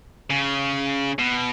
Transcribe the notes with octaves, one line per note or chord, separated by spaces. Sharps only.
C#3
B2